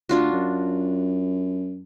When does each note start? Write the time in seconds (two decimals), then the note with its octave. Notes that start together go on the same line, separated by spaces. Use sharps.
0.09 D2 D4 F4 F#4
0.32 F#2